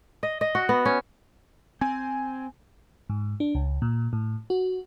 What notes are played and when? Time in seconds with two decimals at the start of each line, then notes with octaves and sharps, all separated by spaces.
0.23 D#5
0.41 D#5
0.55 F#4
0.69 B3
0.85 C#4
1.81 C4 G#5
3.10 G#2
3.40 D4
3.55 C#2
3.82 A#2
4.13 A2
4.50 F#4